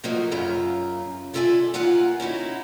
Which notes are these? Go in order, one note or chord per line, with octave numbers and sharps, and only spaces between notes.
F3 F#3 A3 A#3 F#4 D#5
F#2 C#3 F4 A#5
G#3 F4 A4 D5 E5 G#5
D#2 F4 A#4 F#5 G#5
C#4 D#4 E4 F#4